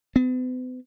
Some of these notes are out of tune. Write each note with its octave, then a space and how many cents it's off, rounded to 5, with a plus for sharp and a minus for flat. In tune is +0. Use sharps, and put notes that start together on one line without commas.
B3 +45